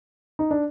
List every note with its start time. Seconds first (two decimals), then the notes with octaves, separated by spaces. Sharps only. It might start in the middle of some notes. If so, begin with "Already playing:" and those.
0.39 D#4
0.51 D4